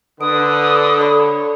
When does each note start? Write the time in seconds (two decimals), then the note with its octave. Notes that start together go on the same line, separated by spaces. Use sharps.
0.21 D3 B4 D#6 D7
1.00 A4 C#5 D5 B5